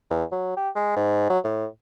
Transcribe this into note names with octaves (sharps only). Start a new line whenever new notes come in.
E2
F#3
G4
G#3
G#2
F#3
A2